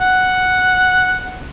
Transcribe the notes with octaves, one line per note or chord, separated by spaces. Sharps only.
F#5